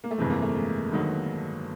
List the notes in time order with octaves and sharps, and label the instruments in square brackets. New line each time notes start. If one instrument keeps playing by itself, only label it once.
[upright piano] A#3
A3
[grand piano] G1 F2 C3 E3 [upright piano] G#3
[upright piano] A#3
A3
G#3
[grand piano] G1 G2 D#3 F#3 B3